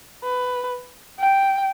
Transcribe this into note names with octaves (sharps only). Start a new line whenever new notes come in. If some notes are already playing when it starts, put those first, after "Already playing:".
B4
G5